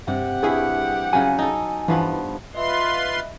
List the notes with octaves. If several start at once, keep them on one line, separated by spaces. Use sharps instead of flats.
G2 C3 G4 F#5
G2 E4 G#4
C#3 F#3 G#5
D#4 A4
G2 E3 F3 B3
F4 B4 D#5 E5 B5 C6